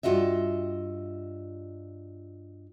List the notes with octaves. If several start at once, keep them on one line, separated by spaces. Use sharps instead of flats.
G2 F3 F4 F#4 D#5 E5